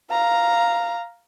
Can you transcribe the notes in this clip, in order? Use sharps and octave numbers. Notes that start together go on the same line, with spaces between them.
F5 A#5